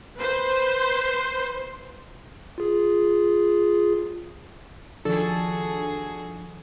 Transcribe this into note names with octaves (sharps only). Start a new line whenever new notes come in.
B4 C5
F4 G#4
D#3 F3 D4 F#4 G#4 A4